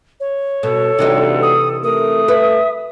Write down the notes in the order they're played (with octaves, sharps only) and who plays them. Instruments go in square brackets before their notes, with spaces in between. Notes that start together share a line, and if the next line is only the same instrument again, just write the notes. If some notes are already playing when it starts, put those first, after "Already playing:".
[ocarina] C#5
[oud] B2 [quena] A4
[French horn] D2 [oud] C3 E3 D#4
[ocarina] D#6
[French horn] A3 [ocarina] A#4 [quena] D#6
[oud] B4 [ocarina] E5